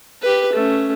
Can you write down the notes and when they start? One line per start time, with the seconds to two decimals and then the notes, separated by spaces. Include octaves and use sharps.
0.22 G4 B4
0.53 A3 C#4